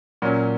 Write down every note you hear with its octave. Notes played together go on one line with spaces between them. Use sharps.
A#2 F#3 A#3 C#4